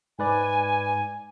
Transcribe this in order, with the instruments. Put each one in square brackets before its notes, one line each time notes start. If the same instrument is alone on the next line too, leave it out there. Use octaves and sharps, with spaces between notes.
[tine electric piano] G#2 B4 D5 [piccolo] G#5